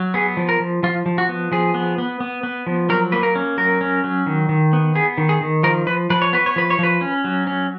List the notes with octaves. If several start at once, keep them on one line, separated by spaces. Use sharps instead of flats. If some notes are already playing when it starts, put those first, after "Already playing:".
Already playing: F#3
B3 G#4
F3
A#4
F3
F3 F4
F3
F#4
B3
F3 G#4
B3
B3
B3
B3
F3
F#3 A#4
A#3 B4
A#4
C#4
F#3 A#4
C#4
F#3
D#3
D#3
B3
B3 G#4
D#3
G#4
D#3
F3 A#4
F3 B4
F3 B4
C#5
B3 B4
C#5
F3 B4
C#5
F3 B4
C#4
F#3
C#4